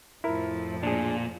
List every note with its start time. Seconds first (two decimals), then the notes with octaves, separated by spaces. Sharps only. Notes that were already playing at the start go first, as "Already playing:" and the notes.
0.24 F2 A2 F3 E4 A#4
0.83 A#2 D4 G#4